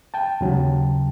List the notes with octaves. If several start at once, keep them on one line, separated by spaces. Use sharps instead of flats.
G5 A5
D#2 C#3 F#3